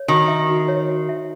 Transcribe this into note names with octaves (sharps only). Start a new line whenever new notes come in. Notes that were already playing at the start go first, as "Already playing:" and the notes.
Already playing: C#5
D#3 F#4
E5
F#4
C#5
F#4
E5